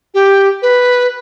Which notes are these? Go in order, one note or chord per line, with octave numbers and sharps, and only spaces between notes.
G4
B4